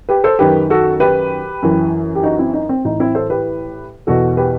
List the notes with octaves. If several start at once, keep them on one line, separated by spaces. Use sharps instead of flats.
G4 B4
A4 C5
F#2 D#3 G4 B4
F#4 A4
G4 B4
F#2 E3
G4
D#4 F#4
C4 E4
D#4
C4
A2 E3 D#4
C4 E4
A4 C5
G4 B4
E2 B2 F#4 A4
G4 B4